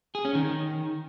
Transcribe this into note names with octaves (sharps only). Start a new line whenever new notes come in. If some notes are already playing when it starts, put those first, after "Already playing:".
G#4
C#4
D#3